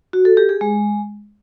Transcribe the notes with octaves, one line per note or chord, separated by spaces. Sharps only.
F#4
A4
G4
G#4
G#3